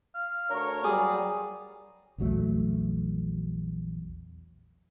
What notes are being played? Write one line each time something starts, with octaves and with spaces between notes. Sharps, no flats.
F5
D2 D4 A#4 C#5
F#3 G3 G#4 D5
A#1 E2 F#3 A3